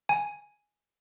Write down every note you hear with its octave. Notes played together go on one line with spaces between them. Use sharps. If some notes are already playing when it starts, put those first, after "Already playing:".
G#5